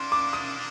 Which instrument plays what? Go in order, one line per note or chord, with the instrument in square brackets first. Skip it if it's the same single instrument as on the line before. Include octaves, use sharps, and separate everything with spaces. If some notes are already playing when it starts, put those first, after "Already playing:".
Already playing: [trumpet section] G3 A#3 D4 [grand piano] C6
[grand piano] D6
D#6